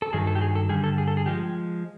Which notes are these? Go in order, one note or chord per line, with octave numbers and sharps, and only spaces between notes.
A4
G2 D#3 F#3 G#4
A4
G4
G#4
A4
G2 D3 G3 G#4
A4
G#4
A4
G#4
F3 G#3 G4